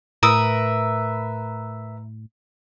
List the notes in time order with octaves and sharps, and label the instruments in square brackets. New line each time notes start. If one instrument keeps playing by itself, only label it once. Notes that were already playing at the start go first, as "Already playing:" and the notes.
[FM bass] A2 [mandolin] A#4 B4 E5 [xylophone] A#5 D#6 E6